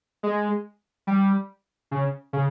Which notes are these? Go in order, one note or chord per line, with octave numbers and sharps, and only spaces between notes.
G#3
G3
C#3
C#3